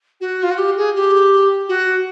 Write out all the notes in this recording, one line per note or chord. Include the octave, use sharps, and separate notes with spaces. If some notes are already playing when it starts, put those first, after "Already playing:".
F#4
F4
F#4
G4
G#4
G4
F#4